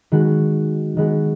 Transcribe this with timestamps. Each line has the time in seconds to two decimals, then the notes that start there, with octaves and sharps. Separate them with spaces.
0.12 D#3 G#3 B3 F#4
0.97 D#3 G#3 B3 F#4